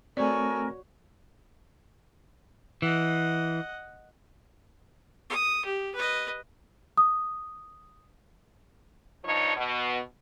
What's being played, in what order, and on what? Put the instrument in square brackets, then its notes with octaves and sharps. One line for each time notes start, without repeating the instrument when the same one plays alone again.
[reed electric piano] A3 C4 [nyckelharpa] F#4 C#5 [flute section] A4 A#4 G#5 [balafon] D5
[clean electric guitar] E3 [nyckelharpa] D#5 F#5
[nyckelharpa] D#6
G4
B4 D#5
[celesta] D#6
[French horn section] G2 F3 D#4 C#5
B2